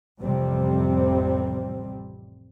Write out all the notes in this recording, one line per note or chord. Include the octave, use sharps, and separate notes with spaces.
A1 F2 C3 G3 C4